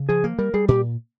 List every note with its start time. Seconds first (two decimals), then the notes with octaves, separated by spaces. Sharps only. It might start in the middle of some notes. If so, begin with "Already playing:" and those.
Already playing: C#3
0.09 F3 G#4
0.24 A#3
0.39 G3 A#4
0.54 G3 G#4
0.68 A#2 G4